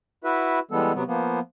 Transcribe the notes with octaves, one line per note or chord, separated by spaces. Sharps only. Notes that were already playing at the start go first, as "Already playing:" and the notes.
E4 F#4 B4 E5
E3 G3 G#3 B3 A4
C3 F#3 B3
F3 A#3 B3